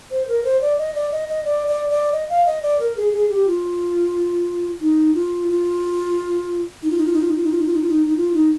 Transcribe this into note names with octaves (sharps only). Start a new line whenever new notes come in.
C5
A#4
C5
D5
D#5
D5
D#5
D#5
D5
D5
D5
D#5
F5
D#5
D5
A#4
G#4
G#4
G4
F4
D#4
F4
F4
D#4
F4
D#4
F4
D#4
F4
D#4
F4
D#4
F4
D#4
F4
D#4
F4
D#4
D#4
F4
D#4